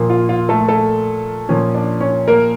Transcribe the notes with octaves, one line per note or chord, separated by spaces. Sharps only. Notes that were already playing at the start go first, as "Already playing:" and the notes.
Already playing: A#2 F3 A#3
F4
F4
A3 A4
A3 A4
A#2 F3 C#4
D4 D5
C#4 C#5
A#3 A#4